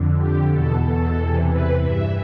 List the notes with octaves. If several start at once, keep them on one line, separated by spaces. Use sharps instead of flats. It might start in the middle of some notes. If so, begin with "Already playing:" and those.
Already playing: F2 D3
G4
E2 B2 A4
A4
E2 C3 E3
B4
G2 E3 E5